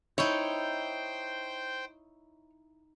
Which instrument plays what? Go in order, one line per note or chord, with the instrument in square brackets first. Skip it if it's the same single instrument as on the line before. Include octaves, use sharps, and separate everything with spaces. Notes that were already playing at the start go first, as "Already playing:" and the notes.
[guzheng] D#4 E4 [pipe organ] C5 G5 [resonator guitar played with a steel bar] C#5